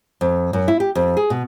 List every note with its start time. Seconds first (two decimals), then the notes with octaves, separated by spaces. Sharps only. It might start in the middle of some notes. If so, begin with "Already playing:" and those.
0.21 F2
0.53 F#2
0.68 E4
0.80 G4
0.95 F2
1.17 G#4
1.30 B2